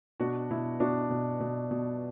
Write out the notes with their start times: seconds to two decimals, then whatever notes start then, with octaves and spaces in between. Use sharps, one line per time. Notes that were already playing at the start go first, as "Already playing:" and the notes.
0.20 B2 D4 F#4
0.51 B2 E4
0.80 B2 D4 F#4
1.10 B2
1.40 B2
1.71 B2